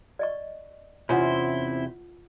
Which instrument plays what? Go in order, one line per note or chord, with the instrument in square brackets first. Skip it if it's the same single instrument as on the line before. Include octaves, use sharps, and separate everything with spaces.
[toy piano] D5 D#5 C#6
[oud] E2 C3 C#4 [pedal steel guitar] E4 C5 [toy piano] F4 F#5